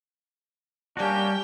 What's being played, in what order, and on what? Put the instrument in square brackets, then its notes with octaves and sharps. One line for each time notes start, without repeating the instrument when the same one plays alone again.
[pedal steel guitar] G3 F#4 [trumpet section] A#3 C#4 D4 [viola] G4 G5